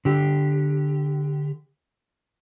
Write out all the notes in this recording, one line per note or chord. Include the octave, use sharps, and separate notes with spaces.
D3 G4